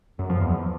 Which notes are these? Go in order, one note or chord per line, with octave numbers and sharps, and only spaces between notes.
F#2
F3
E2